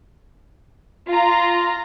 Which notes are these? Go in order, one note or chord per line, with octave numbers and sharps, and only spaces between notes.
F4 A#5